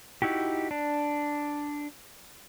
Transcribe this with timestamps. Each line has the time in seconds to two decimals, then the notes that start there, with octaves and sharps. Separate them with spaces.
0.22 D#4 E4 F#4 G4
0.71 D4